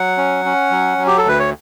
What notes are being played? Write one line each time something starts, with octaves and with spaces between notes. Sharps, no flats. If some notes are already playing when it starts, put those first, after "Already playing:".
Already playing: F#3 F#5
C#4
C#4
F#3
F#3
G4
A4
D2
B4
C#5